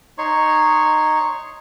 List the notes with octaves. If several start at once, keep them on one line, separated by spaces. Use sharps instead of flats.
D#4 C#5 C6 C#6